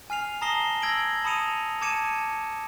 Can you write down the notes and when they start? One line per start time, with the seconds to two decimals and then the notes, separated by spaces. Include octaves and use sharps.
0.10 G#5 F6 C7 F7
0.41 A5 A#5 D#6 A#6 C7 G7
0.82 E6 G#6 A#6 D7 F#7
1.24 A5 B5 D#6 C#7 D#7 F7
1.81 A5 D6 G#6 C#7 D#7 E7